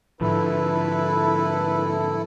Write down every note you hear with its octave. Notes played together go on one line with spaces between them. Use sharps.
G#2 D3 F3 E4 A4 B4